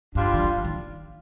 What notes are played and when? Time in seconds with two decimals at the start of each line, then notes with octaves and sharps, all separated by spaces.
0.15 G2 G3 D4 F4
0.34 D#3
0.44 F3
0.65 D#3